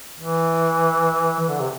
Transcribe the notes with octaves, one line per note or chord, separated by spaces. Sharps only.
E3
E3
D3
C3